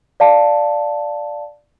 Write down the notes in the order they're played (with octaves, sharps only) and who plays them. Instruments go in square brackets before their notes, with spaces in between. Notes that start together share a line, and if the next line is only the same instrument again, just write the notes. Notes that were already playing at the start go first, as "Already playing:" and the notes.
[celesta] D5 F5 A5